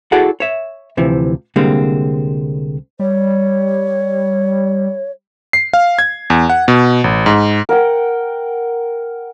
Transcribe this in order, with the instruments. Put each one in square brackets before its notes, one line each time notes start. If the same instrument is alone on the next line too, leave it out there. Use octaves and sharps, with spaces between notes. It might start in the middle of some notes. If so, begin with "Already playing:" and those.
[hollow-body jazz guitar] E4 F#4 G#4 A4 D5 F#5
C#5 E5
D2 C3 E3 F3
C2 D3 G3 G#3 A#3 C4
[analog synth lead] G3 [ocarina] C#5
[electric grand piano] C7
F5
G#6
E2
F#5
B2
A1
G#2
[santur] A#4 F#5 G5